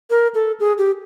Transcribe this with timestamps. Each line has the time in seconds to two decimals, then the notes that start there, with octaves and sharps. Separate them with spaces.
0.10 A#4
0.35 A4
0.60 G#4
0.78 G4